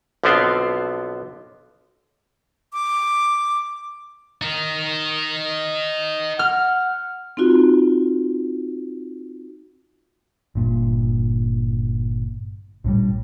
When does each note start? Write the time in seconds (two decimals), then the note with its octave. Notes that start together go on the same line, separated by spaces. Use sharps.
0.24 B1 D3 F3 B3 C4 C5
2.73 D6
4.42 D#4 A#4
6.39 F#5 F6
7.37 C4 D#4 F4 F#4
10.55 G1 A#2
12.84 A#1 A2 G3